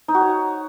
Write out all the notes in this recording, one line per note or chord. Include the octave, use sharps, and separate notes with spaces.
D#4
F#4
C#5